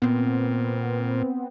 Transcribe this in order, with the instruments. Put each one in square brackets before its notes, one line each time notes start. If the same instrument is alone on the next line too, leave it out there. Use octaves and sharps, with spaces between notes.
[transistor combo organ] A#2 [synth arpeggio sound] B3 C4